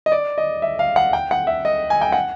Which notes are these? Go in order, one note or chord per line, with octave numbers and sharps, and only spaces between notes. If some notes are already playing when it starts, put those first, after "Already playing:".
D#5
D5
D#5
E5
F5
F#5
G5
F#5
E5
D#5
G#5
G5
F#5